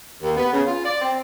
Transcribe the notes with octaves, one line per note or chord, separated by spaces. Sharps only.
D#2
B3
C#3
F4
D5
C4